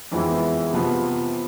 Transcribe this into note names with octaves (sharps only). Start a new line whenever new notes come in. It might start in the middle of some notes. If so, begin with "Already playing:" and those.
F2 E3 G#3 B3 E4
C3 F3 B3